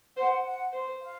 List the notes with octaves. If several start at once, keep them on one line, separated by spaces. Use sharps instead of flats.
C5 F#5
F#5
C5
F5